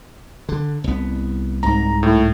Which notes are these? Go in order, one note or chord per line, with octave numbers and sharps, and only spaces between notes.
D3
C2 B3
C2 G#2 A#5
A2